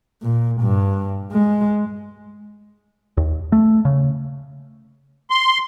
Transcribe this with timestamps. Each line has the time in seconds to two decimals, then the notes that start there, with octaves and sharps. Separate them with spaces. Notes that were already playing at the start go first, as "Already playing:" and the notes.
0.22 A#2
0.61 G2
1.32 G#3
3.17 D#2
3.52 A3
3.85 C#3
5.30 C6